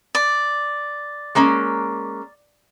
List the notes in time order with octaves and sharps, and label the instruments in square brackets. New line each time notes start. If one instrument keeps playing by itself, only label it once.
[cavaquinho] D5
[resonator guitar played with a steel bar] G#3 A#3 C#4